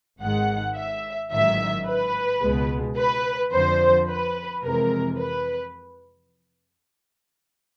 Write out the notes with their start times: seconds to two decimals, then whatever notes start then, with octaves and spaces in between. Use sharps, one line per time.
0.21 G#1 G#2 D#3 G#3 F#5
0.76 E5
1.31 A1 G#2 D#3 F#3 E5
1.86 B4
2.42 C#2 B2 G#3
2.97 B4
3.52 F2 D3 F3 C5
4.08 B4
4.63 F2 C3 E3 G#3 A#4
5.18 B4